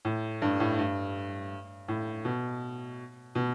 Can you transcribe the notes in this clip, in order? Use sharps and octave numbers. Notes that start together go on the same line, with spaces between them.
A2
G2
A2
G2
A2
B2
B2